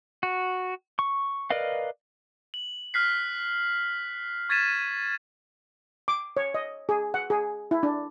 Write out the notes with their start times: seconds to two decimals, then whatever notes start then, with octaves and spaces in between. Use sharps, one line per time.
0.23 F#4
0.99 C#6
1.50 A#4 B4 D5 D#5 F5
2.54 F#7
2.94 F6 F#6 B6 C7
4.49 C#6 G#6 A6 B6 D#7 E7
6.08 D6
6.37 C#5
6.54 D#5
6.89 G#4
7.14 F#5
7.30 G#4
7.71 E4
7.83 D4